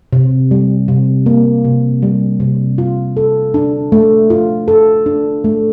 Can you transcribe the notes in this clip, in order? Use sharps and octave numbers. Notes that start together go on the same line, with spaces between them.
C3
G3
C3
A#3
C3
G3
C3
F4
A4
D4
A3
F4
A4
D4
A3